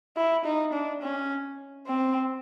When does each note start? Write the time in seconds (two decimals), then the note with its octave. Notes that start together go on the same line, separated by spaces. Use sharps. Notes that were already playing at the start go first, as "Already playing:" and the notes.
0.17 E4
0.45 D#4
0.73 D4
1.02 C#4
1.87 C4